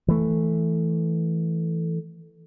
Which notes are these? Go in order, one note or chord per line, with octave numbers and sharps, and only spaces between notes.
E3 A3